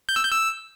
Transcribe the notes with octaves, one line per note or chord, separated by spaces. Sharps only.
G6
E6
G6
E6